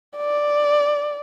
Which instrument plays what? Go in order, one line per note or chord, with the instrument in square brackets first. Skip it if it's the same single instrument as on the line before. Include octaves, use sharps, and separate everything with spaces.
[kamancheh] D5